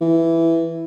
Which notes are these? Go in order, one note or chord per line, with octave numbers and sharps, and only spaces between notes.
E3